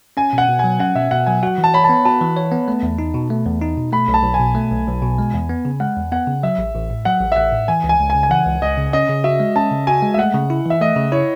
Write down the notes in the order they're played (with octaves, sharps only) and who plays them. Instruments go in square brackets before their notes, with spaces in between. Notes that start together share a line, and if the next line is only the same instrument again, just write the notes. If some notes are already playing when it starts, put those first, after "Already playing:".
[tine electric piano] C#4 [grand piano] G#5
[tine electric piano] B2 [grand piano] F#5
[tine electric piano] B2
[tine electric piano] F#3 [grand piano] G#5
[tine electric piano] C#4 [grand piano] F#5
[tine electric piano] B2 [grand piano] E5
[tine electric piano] B2 [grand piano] F#5
[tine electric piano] F#3 [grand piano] G#5
[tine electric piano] F#4 [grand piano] F#5
[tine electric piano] E3
[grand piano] A5
[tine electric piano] C#5 [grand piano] B5
[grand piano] A5
[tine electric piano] B3
[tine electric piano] F#4 [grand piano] A5
[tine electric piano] E3
C#5
B3
A3
E2
D#4
B2
A3
E2
D#4
B2
[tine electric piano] A3 [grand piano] B5
[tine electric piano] B1
[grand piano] A5
[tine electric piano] B1
[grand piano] G#5
[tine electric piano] B2
A3
B1
B1
B2
G#3
E2
B3
C#3
[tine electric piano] G#3 [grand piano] F#5
[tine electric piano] E2
[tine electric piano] B3 [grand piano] F#5
[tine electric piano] C#3
[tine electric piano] F#3 [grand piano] E5
[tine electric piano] A1
A1
A2
[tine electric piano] F#3 [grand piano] F#5
[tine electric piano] A1
[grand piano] E5
[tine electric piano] A1 [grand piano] F#5
[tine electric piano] A2
[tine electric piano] E3 [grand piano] G#5
[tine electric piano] C#2
[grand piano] G#5
[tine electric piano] C#2
[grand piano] G#5
[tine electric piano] C#3
[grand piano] G#5
[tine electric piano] E3 [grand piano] F#5
[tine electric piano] C#2
[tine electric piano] C#2 [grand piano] D#5
[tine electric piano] C#3
[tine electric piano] C#4 [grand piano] D#5
[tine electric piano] C#3
[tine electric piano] F#4 [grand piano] E5
[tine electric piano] G#3
[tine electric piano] C#4 [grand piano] A5
[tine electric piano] C#3
[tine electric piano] F#4 [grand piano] G#5
[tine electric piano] G#3
[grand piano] E5
[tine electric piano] A3 [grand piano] F#5
[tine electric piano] C#3
E4
[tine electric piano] E3 [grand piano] E5
[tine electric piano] A3 [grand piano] D#5
[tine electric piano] C#3
[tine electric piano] E4 [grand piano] C#5